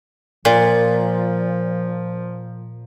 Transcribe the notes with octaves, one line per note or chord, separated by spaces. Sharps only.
A#2 F3